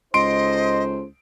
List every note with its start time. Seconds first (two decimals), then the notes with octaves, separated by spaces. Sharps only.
0.14 C#2 D#4 A4 C5 D#5 C6 D7